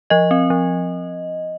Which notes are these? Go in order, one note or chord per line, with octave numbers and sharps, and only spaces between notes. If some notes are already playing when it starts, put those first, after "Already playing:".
F3 D#5
C4
F3